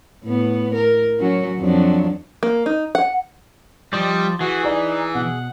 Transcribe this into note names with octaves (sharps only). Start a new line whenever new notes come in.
A2 B3
A#4
F#3 C#4 F#4
F2 F#3 D4
A#3
D#4
F#5
F3 G3 C5 D5 D#5
E3 F#4 G#4
D#4 D5
B2 F#5